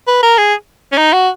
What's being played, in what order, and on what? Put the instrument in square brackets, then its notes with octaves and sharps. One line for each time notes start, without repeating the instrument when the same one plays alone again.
[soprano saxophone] B4
A#4
G#4
C#4
D#4
F#4